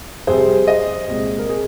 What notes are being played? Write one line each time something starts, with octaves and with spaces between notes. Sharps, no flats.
F2 C3 G3 G#4 C5
C5 D#5
C2 A#2 G#3
A#4
G#4